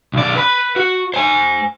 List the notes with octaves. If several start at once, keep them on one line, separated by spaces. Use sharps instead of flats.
B1 D5
B4 B5
F#4
C5 G#5